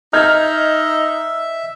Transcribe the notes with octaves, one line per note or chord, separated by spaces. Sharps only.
D#4 D#5 E5 F6 G6 G#6